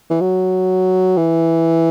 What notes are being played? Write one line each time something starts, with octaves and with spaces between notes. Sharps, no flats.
E3
F#3
E3